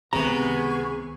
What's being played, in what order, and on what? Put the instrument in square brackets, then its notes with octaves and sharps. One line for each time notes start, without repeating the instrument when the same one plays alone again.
[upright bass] C#2 D#3 [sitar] C3 [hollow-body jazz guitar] B3 A#5 [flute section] G#4 B4 C#6